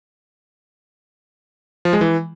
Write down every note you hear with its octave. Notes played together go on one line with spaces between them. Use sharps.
F3
G#3
E3